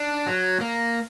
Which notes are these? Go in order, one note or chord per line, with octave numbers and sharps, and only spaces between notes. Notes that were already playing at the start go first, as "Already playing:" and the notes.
Already playing: D4
F#3
A#3